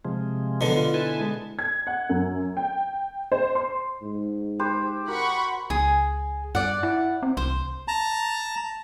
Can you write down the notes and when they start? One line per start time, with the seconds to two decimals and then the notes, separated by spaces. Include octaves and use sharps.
0.05 C3 F3 G#3
0.61 B2 D3 F#3
0.75 F4
0.94 E4 B4 G#5 A5
1.19 G#3
1.59 G#6
1.87 F#5
2.09 F#2
2.57 G5
3.32 C5
3.55 C6
4.02 G#2
4.59 G4 B4 C5
5.08 F#4 A#4 F#5 B5 C#6
5.70 C#2 G#4
6.55 G2 D5 F#5
6.83 E4
7.23 C4
7.37 C2 C5
7.88 A5 A#5